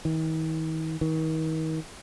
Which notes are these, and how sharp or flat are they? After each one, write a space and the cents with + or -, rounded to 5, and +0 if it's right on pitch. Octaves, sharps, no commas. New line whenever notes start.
D#3 +45
D#3 +40